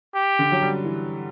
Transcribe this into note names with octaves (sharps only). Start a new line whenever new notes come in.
G4
D3
F#3
G3
E3